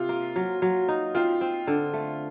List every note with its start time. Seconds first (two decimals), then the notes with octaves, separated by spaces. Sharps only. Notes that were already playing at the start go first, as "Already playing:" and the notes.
Already playing: C3 F4
0.09 A#3
0.36 F#3
0.62 F#3
0.88 D#4
1.15 C4 F4
1.41 C4
1.67 D3
1.93 A3